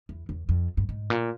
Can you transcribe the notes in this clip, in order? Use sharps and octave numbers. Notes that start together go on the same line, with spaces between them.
E2
E2
F2
G2
G#2
A#2